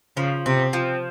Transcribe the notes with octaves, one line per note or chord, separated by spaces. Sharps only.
C#3 F3
C3 C4
F3